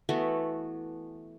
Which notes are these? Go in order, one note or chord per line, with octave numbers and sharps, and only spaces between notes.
E3 A3 B3 F#4